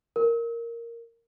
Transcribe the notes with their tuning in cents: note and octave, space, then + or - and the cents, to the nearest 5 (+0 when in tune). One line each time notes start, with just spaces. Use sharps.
A#4 -5